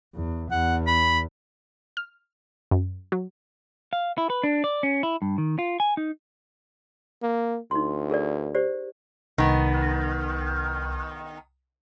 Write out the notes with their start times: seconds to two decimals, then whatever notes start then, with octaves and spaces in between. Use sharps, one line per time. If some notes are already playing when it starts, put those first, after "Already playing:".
0.14 E2
0.51 E2 F#5
0.87 B5
1.97 F6
2.71 F#2
3.12 F#3
3.93 F5
4.18 E4
4.30 B4
4.44 D4
4.64 D5
4.83 C#4
5.03 E4
5.22 G2
5.38 D#3
5.59 F4
5.80 G#5
5.97 D#4
7.22 A#3
7.71 D2 D#4 C6
8.10 G#4 A#4 D5
8.55 G4 C5 D5
9.38 C2 D#3 B3